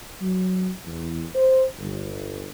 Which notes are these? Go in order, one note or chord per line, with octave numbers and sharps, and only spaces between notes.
F#3
E2
C5
G1